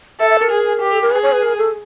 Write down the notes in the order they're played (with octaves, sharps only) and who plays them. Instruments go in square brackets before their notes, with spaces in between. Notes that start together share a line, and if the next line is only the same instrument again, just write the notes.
[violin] A4 [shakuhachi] E5
[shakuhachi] E5
A#4
[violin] G#4
G4
[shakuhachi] A4
A#4
[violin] G#4 [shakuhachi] B4
[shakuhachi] C#5
B4
A#4
A4